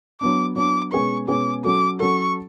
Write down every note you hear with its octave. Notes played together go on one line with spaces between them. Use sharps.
F#3 B3 D4 D6
F#3 B3 D4 D6
B2 G#3 C#4 G#4 B4 C#6
B2 G#3 C#4 G#4 B4 D6
F#3 C#4 F#4 A4 D6
F#3 C#4 F#4 A4 C#6